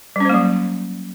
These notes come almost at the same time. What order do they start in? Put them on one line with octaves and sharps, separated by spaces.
G3 C#4 C5 A#3 F#3